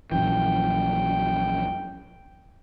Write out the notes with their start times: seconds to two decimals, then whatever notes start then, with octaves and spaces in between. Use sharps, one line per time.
0.12 A#1 F#2 E3 G5